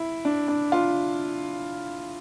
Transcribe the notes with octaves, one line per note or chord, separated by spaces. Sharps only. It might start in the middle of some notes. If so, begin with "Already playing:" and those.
Already playing: E4
D4
D4
F4